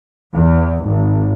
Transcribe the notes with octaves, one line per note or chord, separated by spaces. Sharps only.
E2
G#1